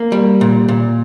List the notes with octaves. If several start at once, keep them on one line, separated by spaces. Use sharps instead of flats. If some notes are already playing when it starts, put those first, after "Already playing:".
Already playing: A#3
G3
A#2
A#2